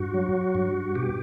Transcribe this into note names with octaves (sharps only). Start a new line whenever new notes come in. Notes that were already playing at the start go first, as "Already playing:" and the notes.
Already playing: G2 F#4
F#3
G2
B2 G4